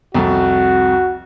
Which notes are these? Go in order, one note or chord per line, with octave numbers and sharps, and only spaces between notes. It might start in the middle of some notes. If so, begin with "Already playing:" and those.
C2 F2 F#4